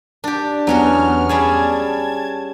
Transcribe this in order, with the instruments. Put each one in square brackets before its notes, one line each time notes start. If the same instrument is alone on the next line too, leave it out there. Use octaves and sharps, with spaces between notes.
[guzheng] D4 G4
[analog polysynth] E2 B3 F6 [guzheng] F#3 C#4 F#4
[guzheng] G3 C#4 G#4 [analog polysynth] A5 G#6